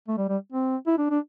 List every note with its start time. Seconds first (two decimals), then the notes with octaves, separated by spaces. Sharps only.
0.08 A3
0.18 G3
0.29 G3
0.52 C4
0.87 E4
0.98 D4
1.11 D4